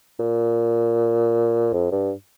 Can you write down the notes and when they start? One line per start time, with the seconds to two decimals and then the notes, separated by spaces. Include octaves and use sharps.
0.19 A#2
1.72 F2
1.91 G2